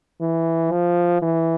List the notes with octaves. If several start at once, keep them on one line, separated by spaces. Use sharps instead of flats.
E3
F3
E3